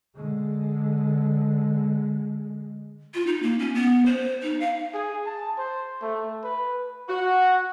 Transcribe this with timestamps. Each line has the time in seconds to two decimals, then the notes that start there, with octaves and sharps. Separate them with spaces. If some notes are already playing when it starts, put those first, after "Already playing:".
0.15 D3 G#3
3.14 F4
3.27 D#4
3.42 A#3
3.59 C#4
3.75 B3
4.06 C5
4.43 D#4
4.60 F5
4.94 G#4
5.26 A5
5.58 C5
6.02 A3
6.44 B4
7.09 F#4